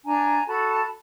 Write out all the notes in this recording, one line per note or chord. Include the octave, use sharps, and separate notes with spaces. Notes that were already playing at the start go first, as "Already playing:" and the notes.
D4 G#5 A#5
F#4 A4 A5 B5